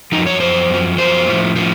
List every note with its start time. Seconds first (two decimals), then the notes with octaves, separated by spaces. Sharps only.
0.12 F#2 F3 D#4
0.27 C#5
0.40 F#2 F3 C5
0.70 F#2 F3
0.98 F#2 F3 C5
1.27 A2 F3
1.56 A2 F3